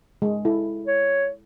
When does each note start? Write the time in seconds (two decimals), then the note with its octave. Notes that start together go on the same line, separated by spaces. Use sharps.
0.22 G#3
0.45 E4 A4
0.87 C#5